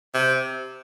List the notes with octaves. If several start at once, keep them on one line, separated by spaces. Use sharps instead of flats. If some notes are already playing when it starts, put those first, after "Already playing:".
C3